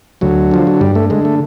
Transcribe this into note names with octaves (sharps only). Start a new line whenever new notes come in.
D2 F#3
D3 F3
F#3
G2 G3
A3
D3 G#3
A3